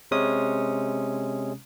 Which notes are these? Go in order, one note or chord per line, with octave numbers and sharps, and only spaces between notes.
C3 G#3 C#4 D#6